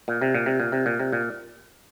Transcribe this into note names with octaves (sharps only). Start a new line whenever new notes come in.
A#2
C3
A#2
C3
A#2
C3
A#2
C3
A#2